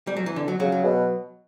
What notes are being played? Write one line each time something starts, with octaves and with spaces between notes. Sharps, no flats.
G3
F#3
E3
D3
F#3
C#3 F#3
F#3
B2